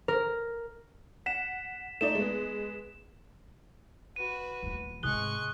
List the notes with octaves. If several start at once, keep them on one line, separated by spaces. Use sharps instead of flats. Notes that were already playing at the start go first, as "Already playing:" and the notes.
A#4
F#5 B6 E7
A3 D#4 D5 E7
G#3 B3
F#4 B4 D#7
D#1 E3
G#2 C3 G#3 C#6 D#6 F#6 G7